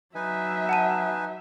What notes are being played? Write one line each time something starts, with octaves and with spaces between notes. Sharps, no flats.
F#3 D#4 B4 E5 G#5
F#5 A5 D#7